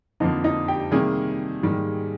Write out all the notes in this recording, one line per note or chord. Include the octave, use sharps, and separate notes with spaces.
F2 D3 F3 A#3 D#4 D#5
D#4 D#5
G4 G5
C3 D#3 G3 A#3 G#4 G#5
G#2 D#3 G3 A#3